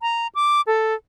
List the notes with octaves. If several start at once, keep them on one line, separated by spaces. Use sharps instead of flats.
A#5
D6
A4